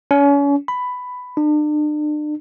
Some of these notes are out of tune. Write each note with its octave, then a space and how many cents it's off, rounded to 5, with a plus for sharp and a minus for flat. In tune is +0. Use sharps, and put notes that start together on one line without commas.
C#4 +35
B5 +10
D4 +40